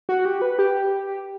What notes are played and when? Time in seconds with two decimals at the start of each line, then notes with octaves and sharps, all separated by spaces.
0.09 F#4
0.25 G4
0.42 B4
0.59 G4